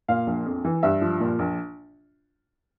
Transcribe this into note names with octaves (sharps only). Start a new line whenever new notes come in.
A#2 F5
A#1
F2
E3
G2 E5
F3
A#2
A#1